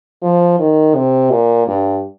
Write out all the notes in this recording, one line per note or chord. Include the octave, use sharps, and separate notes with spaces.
F3
D#3
C3
A#2
G2